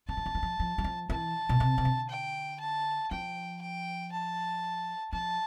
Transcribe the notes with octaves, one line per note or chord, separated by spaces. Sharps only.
D3 A5
E3
D3
E3
F3
F3
G3
F3
E3 A5
B2
C3
C3
D3
G5
A5
F3 G5
G5
A5
F3 A5